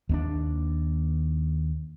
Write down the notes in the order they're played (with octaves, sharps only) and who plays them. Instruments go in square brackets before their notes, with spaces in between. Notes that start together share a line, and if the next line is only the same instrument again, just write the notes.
[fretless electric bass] D#2 B3 D4